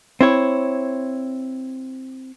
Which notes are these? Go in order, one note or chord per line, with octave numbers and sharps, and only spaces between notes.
C4 E4 C#5